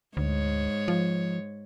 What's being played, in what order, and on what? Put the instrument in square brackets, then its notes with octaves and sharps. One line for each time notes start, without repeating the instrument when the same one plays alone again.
[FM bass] D2 [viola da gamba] G#2 C#5
[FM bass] F3